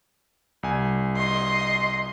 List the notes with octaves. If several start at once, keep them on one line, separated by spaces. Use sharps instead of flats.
C2 G#5
D#5 C6